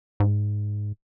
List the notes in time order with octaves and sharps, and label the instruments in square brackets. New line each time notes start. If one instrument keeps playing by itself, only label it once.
[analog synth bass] G#2